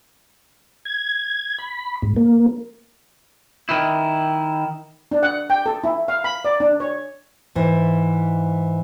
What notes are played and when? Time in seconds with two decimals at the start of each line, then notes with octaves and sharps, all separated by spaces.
0.85 G#6
1.58 B5
2.02 G#2
2.16 A#3
3.69 D#3 E4
5.11 D4
5.23 F#5
5.50 G5
5.66 A4
5.84 E4
6.08 F5
6.24 B5
6.45 D5
6.60 D4
6.80 C#5
7.55 G#2 E3